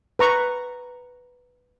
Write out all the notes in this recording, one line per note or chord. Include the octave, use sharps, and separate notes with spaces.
B4 A#5 C#6